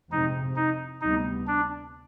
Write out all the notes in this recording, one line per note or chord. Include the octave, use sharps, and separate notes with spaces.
F2 C3 F3 G#3 C4 D#4
D#4
D2 C3 G3 B3 D#4
D4